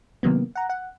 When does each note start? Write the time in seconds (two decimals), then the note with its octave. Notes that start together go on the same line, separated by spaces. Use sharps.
0.23 C3 D#3 F#3 A#3 B3
0.55 F#5 A#5
0.70 F#5